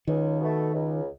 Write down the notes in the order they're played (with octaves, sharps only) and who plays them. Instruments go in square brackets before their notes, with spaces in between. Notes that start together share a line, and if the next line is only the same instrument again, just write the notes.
[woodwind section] C#2 [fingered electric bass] D#3
[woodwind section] B2 A3
C#2